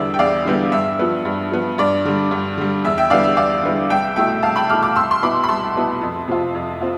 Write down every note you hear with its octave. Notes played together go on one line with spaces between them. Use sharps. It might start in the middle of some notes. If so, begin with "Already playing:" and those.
Already playing: E2 D3 G3 B3 E4 D5 E5
G5
E2 D5 F5
D3 G3 B3 E4
G2 E5
F3 B3
G2
F3 B3
G2 D5
D3 G3
G2
D3 G3
E2 E5
E5 G5
D3 G3 B3 E4 D5 F5
E5
E2 D5 F5
D3 G3 B3 E4
C2 E5 G5
B2 A3 E4 E5 G5
C2 F5 A5
G5 B5
B2 A3 E4 D6 F6
D6 F6
C2 C6 E6
C6
B2 B3 E4 B5 D6
B5
C2 A5 C6
B2 B3 E4
F2
C3 F3 C4 F4
F2
C4 F4